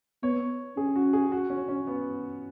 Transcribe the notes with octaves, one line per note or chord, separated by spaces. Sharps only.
B3 C#5
C#4 G#4
F#4
G#4
F#4
C#4
C#4
B3